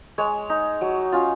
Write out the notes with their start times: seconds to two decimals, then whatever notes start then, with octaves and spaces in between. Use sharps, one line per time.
0.18 G#3 C#5
0.50 D#4
0.81 F#3
1.12 C#4 F4